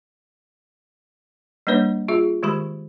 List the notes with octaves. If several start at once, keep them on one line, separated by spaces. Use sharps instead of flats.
G3 A#3 D4 B4 C#5
F4 G#4 E5
D#3 G#3 G4 B5